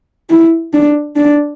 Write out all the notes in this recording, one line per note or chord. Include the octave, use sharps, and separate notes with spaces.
E4
D4
D4